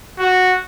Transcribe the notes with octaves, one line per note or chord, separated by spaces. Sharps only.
F#4